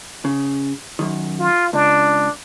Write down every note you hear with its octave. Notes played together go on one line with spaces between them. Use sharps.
C#3
F#2 D#3
F4
C#2 D4